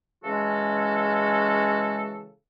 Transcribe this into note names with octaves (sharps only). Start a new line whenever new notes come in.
C#3 E3 G#3 C#4 F#4 A4